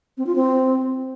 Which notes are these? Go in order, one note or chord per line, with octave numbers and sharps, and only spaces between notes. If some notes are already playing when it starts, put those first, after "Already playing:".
C4
F4
C4